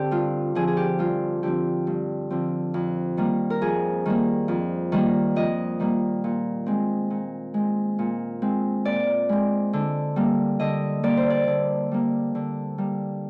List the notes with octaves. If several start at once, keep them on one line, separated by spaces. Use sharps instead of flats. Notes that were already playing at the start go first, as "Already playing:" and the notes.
Already playing: D3 C4 G4
G2 F4
D3 F3 C4 G#4
G#4
G4
G2 F4
D3 F3 C4 G4
G2
D3 F3 C4
F2
D#3 G3 A#3
A#4
F2 G#4
D#3 G3 A#3
F2
D#3 G3 A#3
F2 D#5
D#3 G3 A#3
A#2
G#3 C4
A#2
G#3 C4
A#2
G#3 C4
A#2 D5
G#3 C4
D3
G3 A#3
D3 D#5
G3 A#3 D5
C5
D5
D3
G3 A#3
D3
G3 A#3